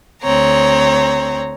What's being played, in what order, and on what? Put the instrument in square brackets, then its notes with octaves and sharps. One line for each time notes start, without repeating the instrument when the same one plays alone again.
[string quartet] D2 C4 C#5 A#5